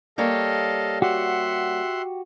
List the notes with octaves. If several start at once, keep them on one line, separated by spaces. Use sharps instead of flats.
G3 A#3 A4 C#5 D#5 F5
F#4 G4 E5 F#5 C6